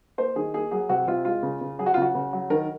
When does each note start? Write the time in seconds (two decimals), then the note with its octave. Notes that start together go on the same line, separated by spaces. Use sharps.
0.18 A#3 C5
0.36 D#3 G#4
0.54 A#3 G#4
0.71 F#3 G#4
0.89 C3 F#4
1.08 C3 F4
1.25 G#3 F4
1.43 C#3
1.61 C#3
1.79 F#3 G#4
1.86 F#4
1.94 F4
1.97 C#3 F#4
2.15 C#3
2.33 F#3
2.50 D#3 A#4